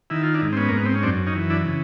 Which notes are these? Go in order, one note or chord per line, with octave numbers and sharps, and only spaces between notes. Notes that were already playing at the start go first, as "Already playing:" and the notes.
D#3 E4
F4
D4 E4
G#2
C4
B3 C#4
A#3
G#2
B3
C4
C#4
F#2 C4 D4
C#4 D#4
E3
D4 E4
C#3